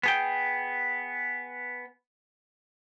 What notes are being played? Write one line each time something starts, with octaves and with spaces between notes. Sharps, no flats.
B3 G#4 G5